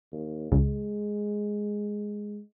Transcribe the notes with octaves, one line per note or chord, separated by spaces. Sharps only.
D#2
C#2 G#3